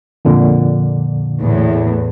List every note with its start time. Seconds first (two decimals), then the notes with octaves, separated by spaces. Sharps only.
0.25 F2 A#2 D3
1.40 E2 A2